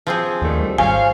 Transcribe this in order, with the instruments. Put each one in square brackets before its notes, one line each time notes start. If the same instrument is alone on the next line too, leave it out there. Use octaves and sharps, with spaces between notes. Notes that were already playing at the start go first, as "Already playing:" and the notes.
[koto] F3 C4 G#4
[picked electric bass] D#2 [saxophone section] D3 D#3 A3
[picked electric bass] G3
[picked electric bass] G#1 [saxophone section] C5 C#5 F5 [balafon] G#5